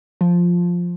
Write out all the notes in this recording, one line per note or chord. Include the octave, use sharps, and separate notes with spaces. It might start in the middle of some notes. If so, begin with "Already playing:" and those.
F3